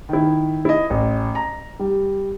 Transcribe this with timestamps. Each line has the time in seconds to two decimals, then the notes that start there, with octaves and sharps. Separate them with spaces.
0.09 D#3 E4
0.65 E4 D#5
0.90 A1
1.35 A#5
1.79 G3